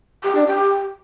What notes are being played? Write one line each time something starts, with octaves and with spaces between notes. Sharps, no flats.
G4
D4
G4